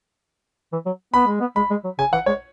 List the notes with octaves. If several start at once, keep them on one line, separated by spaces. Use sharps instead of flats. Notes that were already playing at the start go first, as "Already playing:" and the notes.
E3
F#3
B3 B5
G#3
B3
G#3 B5
G#3
F#3
C#3 G#5
E3 F#5
G#3 C#5